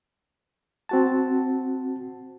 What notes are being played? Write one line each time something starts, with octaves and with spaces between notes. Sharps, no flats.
C4 F#4 A5